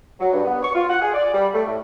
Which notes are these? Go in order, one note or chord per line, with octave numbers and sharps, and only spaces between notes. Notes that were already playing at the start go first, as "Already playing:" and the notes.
F#3
G2
B3
C#6
F4
F#5
G#4
D5
G3
A3
A2